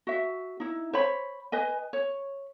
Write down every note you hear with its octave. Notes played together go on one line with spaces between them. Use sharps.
F#4 E5
D#4 E4
C5 C#5 B5
B4 D#5 G#5
C#5